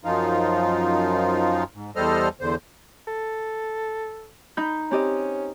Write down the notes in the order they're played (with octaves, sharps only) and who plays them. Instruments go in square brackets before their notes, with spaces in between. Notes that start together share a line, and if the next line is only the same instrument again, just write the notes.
[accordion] F#2 F3 D#4 F4
G#2
E2 G3 A4 C5 D#5 F6
E2 D3 C5
[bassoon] A4
[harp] D#4 B5 G6
[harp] C4 G4 D#5 [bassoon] C#4